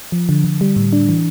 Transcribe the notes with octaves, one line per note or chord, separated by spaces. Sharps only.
F3
D3
D3
G3
A2
D4
E3